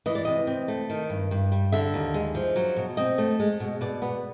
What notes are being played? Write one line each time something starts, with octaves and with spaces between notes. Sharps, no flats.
E3 D#5
D5
C3 D#5
C4
A3
D#3
G2
G2
G3
D3 E5
D#2
G#3
F3
F#3
B2
C4 D#5
A3
G#3
B2
B2 D5
B3